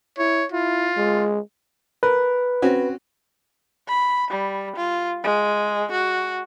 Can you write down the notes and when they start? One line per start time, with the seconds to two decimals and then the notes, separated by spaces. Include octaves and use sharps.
0.18 E4 C#5
0.52 E4 F4
0.97 G#3
2.03 A#4 B4
2.62 C4 C#4 F#4
3.88 B5
4.30 G3
4.76 F4
5.24 G#3
5.91 F#4